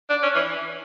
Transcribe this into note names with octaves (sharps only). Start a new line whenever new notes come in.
D4
C#4
E3